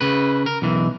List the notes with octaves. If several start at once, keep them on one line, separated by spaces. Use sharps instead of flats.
C#3 B4
A#4
B1 E3